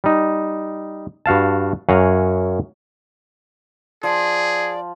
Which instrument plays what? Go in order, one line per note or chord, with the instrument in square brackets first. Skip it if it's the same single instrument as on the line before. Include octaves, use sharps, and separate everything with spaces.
[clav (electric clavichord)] G3 D#4
G2 F#4 F5 A5
F#2 C#5 F5 F#5 G#5 A#5
[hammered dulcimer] F3 [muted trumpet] G#4 [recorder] D5